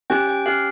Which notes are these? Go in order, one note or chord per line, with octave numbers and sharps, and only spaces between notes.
C#4 G4 G5
G5
C#4 G4 F5